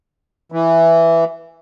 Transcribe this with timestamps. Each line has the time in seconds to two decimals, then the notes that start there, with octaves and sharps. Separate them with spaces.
0.52 E3